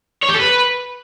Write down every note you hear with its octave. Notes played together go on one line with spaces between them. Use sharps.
C#5
G4
A4
B4